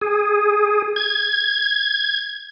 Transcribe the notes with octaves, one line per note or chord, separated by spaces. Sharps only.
G#4
G#6